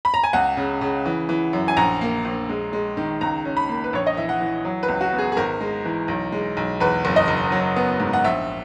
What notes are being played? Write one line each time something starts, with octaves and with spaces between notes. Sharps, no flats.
B5
A#5
G#5
C#2 F#5
C#3
C#3
E3
E3
F#2
G#5
A#1 A#5
A#3
A#1
G#3
G#3
D#3
C#2 A#5
C#4
B5
A#3
B4
A#1 C#5
D#5
E3 E5
F#5
E3
F#3
B4
C#2
F#4
B3
G#4
G#4
G#1 A#4
G#3
E3
B1
G#3
B1
E2 B4
F#1
D#5
F#1
F#3
B3
G#2
F#5
A#1 E5